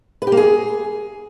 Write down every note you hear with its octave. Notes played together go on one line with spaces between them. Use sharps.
B4
G4
A#3
G#4